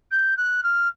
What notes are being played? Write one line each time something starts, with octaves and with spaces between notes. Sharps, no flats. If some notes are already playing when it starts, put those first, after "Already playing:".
G6
F#6
F6